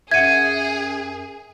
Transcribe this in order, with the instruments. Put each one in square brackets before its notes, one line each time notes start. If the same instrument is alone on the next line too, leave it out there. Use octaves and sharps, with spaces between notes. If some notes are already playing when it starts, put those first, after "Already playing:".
[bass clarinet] F#2 [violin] G#4 [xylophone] E5 F#5 [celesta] G#6 D#7